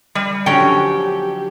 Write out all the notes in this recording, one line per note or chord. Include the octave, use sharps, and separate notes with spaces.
G3
D3 F3 F#3 C#4 G4 G5